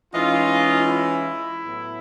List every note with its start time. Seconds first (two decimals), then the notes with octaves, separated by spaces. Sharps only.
0.14 E3 G#3 C#4 D#4 F4
0.87 E4
1.60 A2 F#3 B3